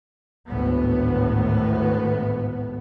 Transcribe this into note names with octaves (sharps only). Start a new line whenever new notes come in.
G#1 D2 A2 B3